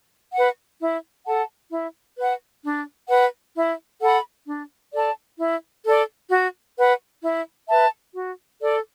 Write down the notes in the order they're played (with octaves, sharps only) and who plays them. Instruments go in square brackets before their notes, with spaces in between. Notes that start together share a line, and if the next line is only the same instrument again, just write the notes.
[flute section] B4 F#5
E4
A4 F#5 A5
E4
B4 F#5
D4
B4 F#5
E4
A4 F#5 B5
D4
A4 D5 A5
E4
A4 D5
F#4
B4 F#5
E4
B4 E5 A5
F#4
A4 D5